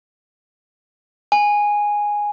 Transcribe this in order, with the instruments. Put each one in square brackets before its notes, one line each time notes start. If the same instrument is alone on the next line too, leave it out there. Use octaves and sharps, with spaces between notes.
[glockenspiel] G#5